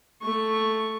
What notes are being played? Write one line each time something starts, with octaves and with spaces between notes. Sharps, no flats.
A3 C#6